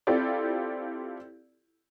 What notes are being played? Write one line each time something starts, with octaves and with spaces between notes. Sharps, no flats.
C4 E4 F4 G4 A4 D5